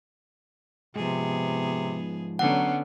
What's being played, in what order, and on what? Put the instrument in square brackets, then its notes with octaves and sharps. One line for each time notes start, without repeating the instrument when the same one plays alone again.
[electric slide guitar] G#2 F3 [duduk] C3 [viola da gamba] B3 G#4
[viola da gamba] D3 B3 C#4 [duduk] F#3 [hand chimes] F#5